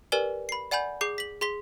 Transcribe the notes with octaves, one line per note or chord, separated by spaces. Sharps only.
G4 A#4 B4 D5 G#5 G7
B5 C7
D5 F#5 G#5 B5 G6
G#4 D6 G6 C7
B6 F#7
G#4 C6 B6 G7